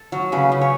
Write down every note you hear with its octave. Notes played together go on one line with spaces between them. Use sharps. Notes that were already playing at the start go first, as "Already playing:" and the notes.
Already playing: A4
F#3
C#3 B4
C#3
C#5